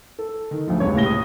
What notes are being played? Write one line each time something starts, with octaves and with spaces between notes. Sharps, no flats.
A4
D#3
D2 F3
E1 C#2 G3 C#5
C#2 A2 C3 A#6 G7
D#6